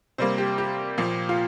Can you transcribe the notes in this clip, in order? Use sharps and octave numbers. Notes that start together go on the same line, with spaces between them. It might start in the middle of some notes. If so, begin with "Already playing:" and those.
C3 G3 A#3 C5
G4
G4
A#2 F3 A#3
F4